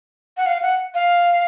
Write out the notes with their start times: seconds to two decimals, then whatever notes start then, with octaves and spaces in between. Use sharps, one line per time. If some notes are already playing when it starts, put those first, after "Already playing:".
0.37 F#5
0.46 F5
0.62 F#5
0.94 F5